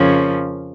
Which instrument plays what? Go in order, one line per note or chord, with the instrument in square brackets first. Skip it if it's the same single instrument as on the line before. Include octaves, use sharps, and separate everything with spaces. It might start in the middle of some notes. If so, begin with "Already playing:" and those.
Already playing: [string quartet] F2 C#3 F3 A#3 C#4